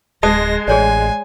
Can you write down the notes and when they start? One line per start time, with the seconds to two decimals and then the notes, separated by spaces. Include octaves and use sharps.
0.23 D1 G#3 A5 D#6 A#6
0.68 A1 G#4 C#5 D5 G#5